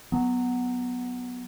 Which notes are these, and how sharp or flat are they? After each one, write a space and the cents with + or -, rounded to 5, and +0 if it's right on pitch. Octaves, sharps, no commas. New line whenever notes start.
F#3 +0 B3 +0